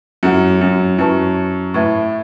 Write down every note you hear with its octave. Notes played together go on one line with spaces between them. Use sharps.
F#2 E4 A4 F#5
F#2
F#2 E4 B4 A5 C#6
A2 E4 B4 E5 C#6